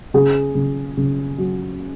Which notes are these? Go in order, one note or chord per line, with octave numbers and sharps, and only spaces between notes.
C#3 G#4
C#3
C#3
F#3